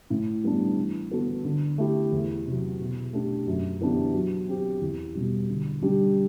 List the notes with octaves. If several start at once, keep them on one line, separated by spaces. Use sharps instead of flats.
A2
G3 B3 D4
E3
B3 F#4 A4
D3
A3 E4 G4
E2
C3 F#3
B2
A3 D4 G4
F#2
E3 B3 D4 G4
F#3
C4 G4
E2
B2 G3
D3
G3 D4 G4